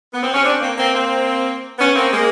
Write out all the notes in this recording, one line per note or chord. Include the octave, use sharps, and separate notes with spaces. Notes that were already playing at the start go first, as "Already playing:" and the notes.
B3
C4
C#4
C4 D4
A#3 C4
A#3 C4
A#3 C4
B3 C#4
A#3 C4
G#3 A#3